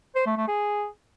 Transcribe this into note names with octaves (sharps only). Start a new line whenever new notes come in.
C5
A3
A3
G#4